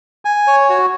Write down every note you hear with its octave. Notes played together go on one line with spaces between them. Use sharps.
G#5
C#5
F#4